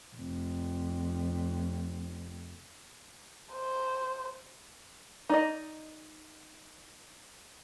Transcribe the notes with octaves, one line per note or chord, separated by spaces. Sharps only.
F1 F2
C5
D#4 D5 D#5